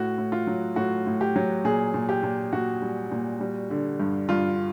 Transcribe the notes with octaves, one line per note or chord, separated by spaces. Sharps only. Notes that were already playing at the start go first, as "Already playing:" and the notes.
Already playing: A2 F#4
A2
F4
F#3
A2 F#4
A2
G4
F#3
A#2 G#4
A#2
G4
A#2
A#2 F#4
G3
A#2
G3
D3
G2
G2 F4